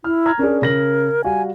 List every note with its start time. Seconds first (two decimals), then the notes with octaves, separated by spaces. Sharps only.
0.04 E4 F6
0.26 A#5 F6 G#6
0.39 C#4 D4 G#4 A#4
0.62 C#3 A#4 A#6 F#7
1.24 G3 F#4 F5 G#5